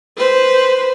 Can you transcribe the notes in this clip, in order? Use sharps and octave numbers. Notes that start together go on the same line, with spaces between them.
B4 C5